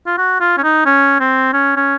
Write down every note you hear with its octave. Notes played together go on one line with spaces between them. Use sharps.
F4
F#4
F4
C#4
D#4
C#4
C4
C#4
C#4